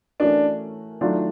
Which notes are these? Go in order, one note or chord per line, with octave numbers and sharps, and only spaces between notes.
E3 A3 C#4 D4 F#4 A#4
D#3 F#3 A3 D4 F4